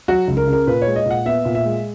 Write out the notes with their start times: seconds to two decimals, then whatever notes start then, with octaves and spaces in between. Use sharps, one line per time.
0.08 F#3 F#4
0.28 C#2
0.37 A#4
0.47 C#3
0.53 A#4
0.67 A#2 B4
0.82 C#5
0.87 G#3
0.96 D#5
1.06 A#2 F#5
1.25 B3 E5
1.45 A#2
1.55 E5
1.65 G#3